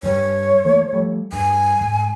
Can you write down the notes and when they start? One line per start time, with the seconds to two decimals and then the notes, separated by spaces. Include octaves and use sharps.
0.03 G2 G3 C#5
0.65 E3 A3 A#3
0.93 F3 G3 A3
1.33 G2 G#5
1.81 G#2